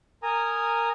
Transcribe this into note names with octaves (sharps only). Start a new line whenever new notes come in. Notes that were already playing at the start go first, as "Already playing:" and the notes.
A#4 G#5 A#5 D#6